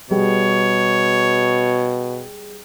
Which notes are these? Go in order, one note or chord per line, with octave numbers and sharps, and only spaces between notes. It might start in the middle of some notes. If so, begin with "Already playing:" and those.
B2 G3 G#4 C#5